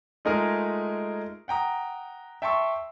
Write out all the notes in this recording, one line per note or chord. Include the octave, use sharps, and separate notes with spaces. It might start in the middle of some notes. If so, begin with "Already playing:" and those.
G#3 A3 D#4 F4 G#4 A#4
F#5 G5 A#5 D#6
E5 G5 A5 C6 C#6 E6